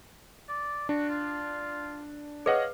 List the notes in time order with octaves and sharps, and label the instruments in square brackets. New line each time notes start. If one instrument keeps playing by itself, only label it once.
[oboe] D5
[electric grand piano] D4 [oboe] F#4
[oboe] F4
[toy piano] G#4 B4 [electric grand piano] C#5 D#5 F#5 [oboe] F5